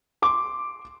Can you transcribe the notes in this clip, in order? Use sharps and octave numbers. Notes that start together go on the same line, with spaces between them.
C6 D6